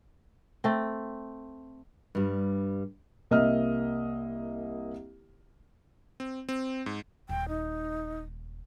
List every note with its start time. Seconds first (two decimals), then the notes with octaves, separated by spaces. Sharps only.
0.64 A3 C4
2.15 G2 G3
3.31 C2 A#3 D#5 E5 F6
6.20 C4
6.49 C4
6.86 G#2
7.29 D#1 G5
7.49 D#4